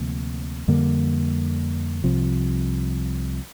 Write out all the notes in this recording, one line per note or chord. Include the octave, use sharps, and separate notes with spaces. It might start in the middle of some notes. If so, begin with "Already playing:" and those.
Already playing: D2 C3 F3 A#3
F2 D3 G3 A#3
C2 C3 F3